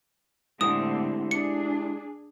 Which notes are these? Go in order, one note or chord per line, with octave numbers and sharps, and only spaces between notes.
A2 D3 G#3 C4 E4 G4 D#6
D4 G#4 C#7